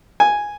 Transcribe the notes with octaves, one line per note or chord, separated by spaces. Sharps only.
G#5